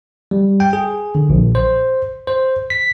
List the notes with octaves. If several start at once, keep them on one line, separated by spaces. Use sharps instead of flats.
G3
G5
G#4
D3
A#1
C5
C5
B6